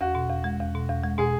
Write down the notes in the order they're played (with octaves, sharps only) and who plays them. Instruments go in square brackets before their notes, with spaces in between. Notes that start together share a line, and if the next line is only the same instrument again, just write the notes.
[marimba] E2 [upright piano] F#4
[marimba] B2
E2
G#3
E2
B2
E2
G#3
[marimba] B2 [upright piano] G#4